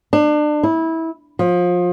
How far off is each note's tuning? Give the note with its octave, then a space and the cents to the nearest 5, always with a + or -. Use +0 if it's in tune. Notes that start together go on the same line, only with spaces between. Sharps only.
D4 +30
E4 -20
F3 +25